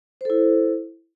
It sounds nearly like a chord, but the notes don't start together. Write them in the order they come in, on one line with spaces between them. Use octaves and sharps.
C5 A4 E4